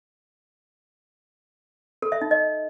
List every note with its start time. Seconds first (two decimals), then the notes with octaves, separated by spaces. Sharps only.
2.02 A4
2.12 E5
2.21 D#4
2.31 D#5